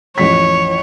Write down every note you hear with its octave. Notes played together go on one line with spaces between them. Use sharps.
A1 F2 C#5 B6